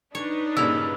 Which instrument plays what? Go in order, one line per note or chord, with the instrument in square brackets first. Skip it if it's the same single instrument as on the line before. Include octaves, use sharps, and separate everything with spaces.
[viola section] D4 D#4 B4 [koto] C#5
[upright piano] G2 A#2 C#3 [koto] E4 [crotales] E6 F7